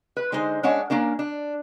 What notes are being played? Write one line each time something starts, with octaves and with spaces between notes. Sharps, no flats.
B4
D3 G#3 D#4 C5
G#3 C#4 D4 C#5 F#5
A#3 C#4 D4 A#4
D4